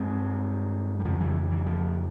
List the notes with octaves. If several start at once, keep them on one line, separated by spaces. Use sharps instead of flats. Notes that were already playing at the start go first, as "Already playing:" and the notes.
Already playing: G2 G#3 C4
G3
F2 C#3 F3 G#3
E3 G3
E3
F3